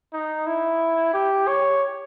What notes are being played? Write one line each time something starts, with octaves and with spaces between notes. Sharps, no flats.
D#4
E4
G4
C#5